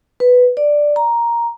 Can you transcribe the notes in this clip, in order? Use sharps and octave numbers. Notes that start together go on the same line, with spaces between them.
B4
D5
A#5